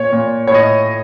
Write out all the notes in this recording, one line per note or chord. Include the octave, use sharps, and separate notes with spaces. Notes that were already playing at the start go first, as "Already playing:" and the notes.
Already playing: A#2 C#5
A#2
A2 C#5
D#5